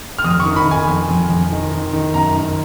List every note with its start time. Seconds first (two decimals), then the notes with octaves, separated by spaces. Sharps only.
0.18 F6
0.24 F2 D#6
0.40 C#6
0.45 D#3
0.56 B5
0.66 D#3
0.71 G#5
0.87 F2
1.09 F2
1.29 F2
1.51 D#3
1.72 D#3
1.93 D#3
2.14 F#2 A#5
2.36 D#3